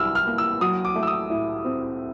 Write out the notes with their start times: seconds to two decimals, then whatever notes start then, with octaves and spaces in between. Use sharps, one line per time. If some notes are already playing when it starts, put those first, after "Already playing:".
Already playing: C2 F#3 E6 F6
0.15 F6
0.27 A#3
0.38 E6
0.61 F#3 D#6
0.85 D6
0.95 A3
1.03 E6
1.07 D#6
1.30 A2
1.65 C4